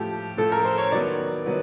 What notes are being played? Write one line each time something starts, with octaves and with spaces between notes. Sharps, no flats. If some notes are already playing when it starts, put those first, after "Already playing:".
Already playing: A2 F3 A3 G4
A2 F3 A3 A4
A#4
C5
C#5
D#3 F#3 B3 D5
D#3 F#3 B3